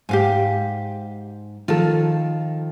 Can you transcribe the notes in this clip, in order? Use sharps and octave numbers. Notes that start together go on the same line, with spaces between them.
G#2 G4 F5 G#5
D#3 F3 F4 A4